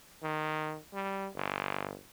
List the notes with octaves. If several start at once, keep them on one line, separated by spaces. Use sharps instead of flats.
D#3
G3
G1